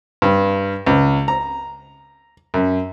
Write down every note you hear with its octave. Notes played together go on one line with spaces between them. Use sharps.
G2
C#2
A#5
F#2